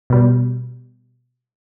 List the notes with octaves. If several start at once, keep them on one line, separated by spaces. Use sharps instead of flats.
B2 G3